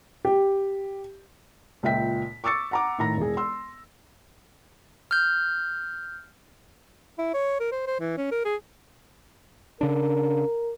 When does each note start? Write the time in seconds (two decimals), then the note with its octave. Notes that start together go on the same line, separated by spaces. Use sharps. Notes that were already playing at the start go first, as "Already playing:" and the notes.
0.25 G4
1.83 C#2 A#2 E5 G5 B6
2.44 C#6 D6 E6 A6 C#7
2.71 F#5 A#5 D6
2.99 A2 D#3 A#5 A#6
3.17 E1 G#4
3.37 C6 E6
5.11 F6 G6
7.18 E4
7.34 C#5
7.60 A#4
7.72 C5
7.87 C5
8.00 E3
8.17 C#4
8.32 A#4
8.45 G#4
9.81 C#3 D4 A#4